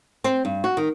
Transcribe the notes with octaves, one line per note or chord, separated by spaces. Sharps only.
C4
G2
F#4
D#3